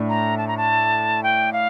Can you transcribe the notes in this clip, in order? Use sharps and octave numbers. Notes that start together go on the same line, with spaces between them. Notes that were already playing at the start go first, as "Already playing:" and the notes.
Already playing: A2 A3 D4
A#5
A5
A#5
A5
G5
F5